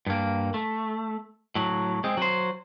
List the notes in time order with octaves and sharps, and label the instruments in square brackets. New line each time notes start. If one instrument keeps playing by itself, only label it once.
[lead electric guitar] G2 A#3
A3
A2 F#3
G#3 C4
F#3 C5